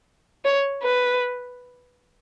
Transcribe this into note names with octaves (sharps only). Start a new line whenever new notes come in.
C#5
B4